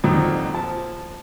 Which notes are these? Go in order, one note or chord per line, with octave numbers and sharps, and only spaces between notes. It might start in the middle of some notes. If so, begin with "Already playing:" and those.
F2 A#2 D#3 F#3
F3 A5